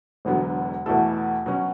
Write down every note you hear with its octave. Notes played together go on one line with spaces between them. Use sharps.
E1 E2 D3 F#3 B3
E2 B2 A3 E4 A4
B2 F#3 C#4